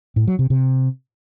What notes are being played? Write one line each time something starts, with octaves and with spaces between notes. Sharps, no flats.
A2
F#3
C3
C3